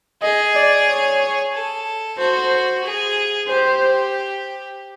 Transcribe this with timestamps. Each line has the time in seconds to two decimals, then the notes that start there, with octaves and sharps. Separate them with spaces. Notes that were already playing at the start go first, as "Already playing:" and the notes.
0.22 G#4 D#5
0.55 D5
0.88 C#5
1.53 A4
2.18 F#4 C5
2.84 G#4
3.49 G4 C5